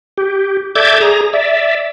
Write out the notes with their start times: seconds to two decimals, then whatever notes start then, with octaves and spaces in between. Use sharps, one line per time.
0.18 G4
0.75 A4 D5 E5 D6 G6 G#6
1.00 G#4 A#5
1.33 D5 E5